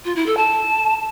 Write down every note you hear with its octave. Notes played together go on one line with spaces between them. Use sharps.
F4
E4
A4
A5